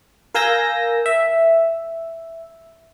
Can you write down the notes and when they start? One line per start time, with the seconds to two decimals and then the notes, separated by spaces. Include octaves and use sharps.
0.35 A#4 F5 G#5 E6 G6 A#6
1.06 E5